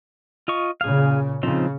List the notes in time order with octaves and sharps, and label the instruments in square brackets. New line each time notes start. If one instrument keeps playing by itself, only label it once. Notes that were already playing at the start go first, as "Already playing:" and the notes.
[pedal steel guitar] F4 D#5 C#6
[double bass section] A#2 C#3 [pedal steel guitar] G#4 F5
[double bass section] C#3 [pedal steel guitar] F3 C4 D#4